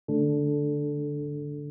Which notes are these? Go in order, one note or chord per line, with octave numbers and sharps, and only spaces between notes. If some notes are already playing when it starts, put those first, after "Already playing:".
D3 A3 D4 A4